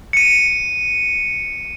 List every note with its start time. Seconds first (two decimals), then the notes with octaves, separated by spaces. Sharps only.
0.13 C#7 D#7